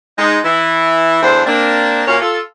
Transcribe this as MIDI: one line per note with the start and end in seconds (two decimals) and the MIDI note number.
0.19 0.39 56
0.19 0.39 63
0.44 1.20 52
0.44 1.20 64
1.23 1.42 40
1.23 1.42 50
1.23 1.42 57
1.23 1.42 62
1.23 1.42 72
1.46 2.04 58
1.46 2.04 60
1.46 2.04 62
2.08 2.19 46
2.08 2.19 58
2.08 2.19 61
2.08 2.19 66
2.08 2.19 73
2.08 2.19 77
2.21 2.40 65
2.21 2.40 69